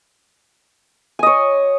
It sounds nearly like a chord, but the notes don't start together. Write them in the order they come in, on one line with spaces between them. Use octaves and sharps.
G#5 D#5 C#5